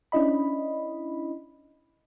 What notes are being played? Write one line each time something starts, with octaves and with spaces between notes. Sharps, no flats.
C#4 D4 E4 D#5 B5